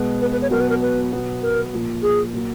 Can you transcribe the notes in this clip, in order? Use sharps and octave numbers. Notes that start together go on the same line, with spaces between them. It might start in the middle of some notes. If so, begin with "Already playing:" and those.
Already playing: B2 G#3 B3
B4
B4
C#5
B2 F#3 B3 A#4
B4
A#4
B4
B2 F#3 B3
A#4
A#2 F3 A#3
G#4
A#2 F#3 A#3